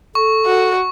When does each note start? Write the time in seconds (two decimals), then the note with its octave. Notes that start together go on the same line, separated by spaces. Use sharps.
0.15 A4 C#6
0.46 F#4